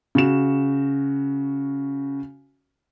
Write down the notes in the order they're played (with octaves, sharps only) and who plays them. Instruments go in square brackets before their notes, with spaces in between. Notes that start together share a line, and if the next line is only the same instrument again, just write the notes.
[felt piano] C#3 F#4 E7